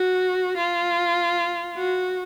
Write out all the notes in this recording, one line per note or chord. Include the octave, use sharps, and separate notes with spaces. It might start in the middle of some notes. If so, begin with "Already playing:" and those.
Already playing: F#4
F4
F#4